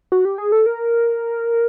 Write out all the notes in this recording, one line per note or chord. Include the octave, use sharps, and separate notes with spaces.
F#4
G4
G#4
A4
A#4